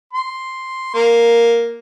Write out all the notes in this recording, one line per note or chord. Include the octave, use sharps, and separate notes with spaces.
C6
A#3